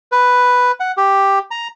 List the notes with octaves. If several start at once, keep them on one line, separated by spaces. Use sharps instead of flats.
B4
F#5
G4
A#5